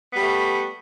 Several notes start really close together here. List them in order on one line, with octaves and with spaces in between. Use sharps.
B3 G3 A3